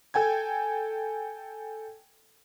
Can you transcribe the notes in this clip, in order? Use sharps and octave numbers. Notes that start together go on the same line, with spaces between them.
A4 G5 G#5 G#6